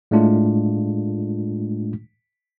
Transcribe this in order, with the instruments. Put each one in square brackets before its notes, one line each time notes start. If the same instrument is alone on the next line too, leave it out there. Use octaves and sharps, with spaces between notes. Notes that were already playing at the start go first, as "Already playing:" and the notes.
[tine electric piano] A2 G#3 A3 D4 F4